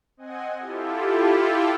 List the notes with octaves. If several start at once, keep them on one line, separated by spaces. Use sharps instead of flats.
C4 D#5 F#5 G#5
E4 F4 G4 A4